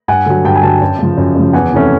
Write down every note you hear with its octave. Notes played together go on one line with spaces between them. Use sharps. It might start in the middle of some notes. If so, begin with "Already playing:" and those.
G2 F#5 G#5
D3 F#3
G2 G5 A5
G#5
D3 F#3 G5 A5
F#2
C#3 F3
F#2
C#3 F3
E2 F#5 G#5
C3 E3 A3 C#4